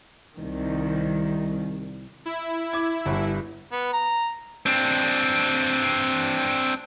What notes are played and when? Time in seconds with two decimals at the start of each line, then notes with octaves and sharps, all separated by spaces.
0.36 C2 D#3
2.26 E4
2.73 D6 G#6
3.06 G1 G2
3.72 B3
3.93 A#5
4.66 C4 D4